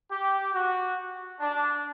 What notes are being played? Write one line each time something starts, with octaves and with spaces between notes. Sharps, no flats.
G4
F#4
D4